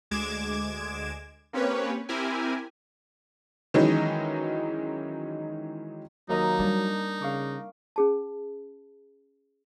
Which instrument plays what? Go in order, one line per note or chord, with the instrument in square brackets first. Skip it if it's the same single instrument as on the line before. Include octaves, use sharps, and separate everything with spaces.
[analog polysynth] D2 G#3 D6 G#6 E7
A#3 C4 C#4 G4 B4 C#5
C4 E4 G4 A#4 G#5
[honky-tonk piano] D#3 E3 F#3 G#3 C#4 D#4
[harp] D#2 A#4 D#5 [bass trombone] F#3 [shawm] D#4
[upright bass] G3 [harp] D4
[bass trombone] C#3 [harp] F5 C#6 D6
[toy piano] C#4 G#4 A5